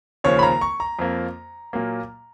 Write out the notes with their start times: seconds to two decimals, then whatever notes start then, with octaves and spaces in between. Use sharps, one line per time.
0.24 D#2 C#3 F3 C#5
0.39 B5
0.43 A#5
0.61 C#6
0.80 A#5
0.99 F2 F3 A#3
1.73 A#2 F#3 A#3